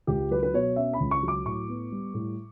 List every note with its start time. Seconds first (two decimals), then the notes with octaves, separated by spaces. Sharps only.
0.07 C#2 G4
0.31 F#3 B4
0.43 B4
0.54 B2 C#5
0.76 C#4 E5
0.94 B5
1.00 C#2
1.11 C#6
1.23 F#3
1.28 D6
1.45 A2 C#6
1.69 B3
1.92 G3
2.14 A2